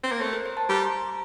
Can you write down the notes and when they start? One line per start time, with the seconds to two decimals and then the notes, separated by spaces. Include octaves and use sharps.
0.03 C4
0.12 A#3
0.21 A3 C5
0.33 A#4
0.46 C5
0.57 A5
0.69 G3 A#5
0.85 C6
1.01 A#5